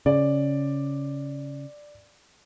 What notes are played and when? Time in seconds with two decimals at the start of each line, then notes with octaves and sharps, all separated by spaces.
0.06 C#3 D5